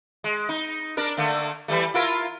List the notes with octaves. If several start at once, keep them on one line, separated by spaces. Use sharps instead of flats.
G#3
D#4
D4 A#4
D3 A3 A#3
E3 G3 A3
E4 F4 A#4